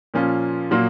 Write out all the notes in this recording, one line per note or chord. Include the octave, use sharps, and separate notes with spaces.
A#2 F3 A#3 C#4 F4
A#2 F#3 A#3